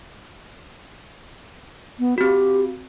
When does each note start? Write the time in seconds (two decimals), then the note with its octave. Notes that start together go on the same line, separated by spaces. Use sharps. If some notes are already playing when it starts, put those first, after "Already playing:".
1.99 B3
2.18 C4 F#4 G4